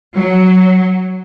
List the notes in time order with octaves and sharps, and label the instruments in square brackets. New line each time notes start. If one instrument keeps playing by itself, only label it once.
[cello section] F#3